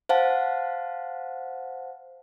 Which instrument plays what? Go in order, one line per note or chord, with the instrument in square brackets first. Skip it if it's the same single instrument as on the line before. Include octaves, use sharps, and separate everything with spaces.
[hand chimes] C5 F5 F#5 A5